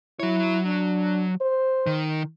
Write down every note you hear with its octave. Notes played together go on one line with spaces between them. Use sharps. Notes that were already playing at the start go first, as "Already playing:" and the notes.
F#3 E4 C#5
D4
C5
D#3